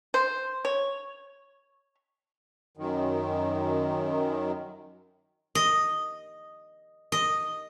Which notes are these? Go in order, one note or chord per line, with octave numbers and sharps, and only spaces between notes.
C5
C#5
F#2 D#3
D#5
D#5